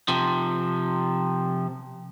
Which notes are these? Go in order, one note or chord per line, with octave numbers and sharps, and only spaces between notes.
C3 F3